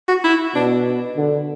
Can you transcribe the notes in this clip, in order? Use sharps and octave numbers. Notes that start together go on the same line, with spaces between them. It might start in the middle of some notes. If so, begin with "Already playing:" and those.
F#4
E4
B2 D4
D3